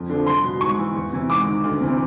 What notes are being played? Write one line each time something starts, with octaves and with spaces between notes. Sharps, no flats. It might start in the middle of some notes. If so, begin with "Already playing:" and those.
Already playing: F2
D3 F3
C2 C6
B2
G#2 C#6
E3
E2
C3 E3
G#2 D6
D#3
D2
C3 E3